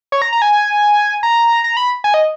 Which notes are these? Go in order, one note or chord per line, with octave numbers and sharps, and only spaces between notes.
C#5
A#5
A#5
G#5
A#5
A#5
B5
G#5
D#5